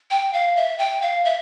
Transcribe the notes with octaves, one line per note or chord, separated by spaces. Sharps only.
G5
F5
E5
G5
F5
E5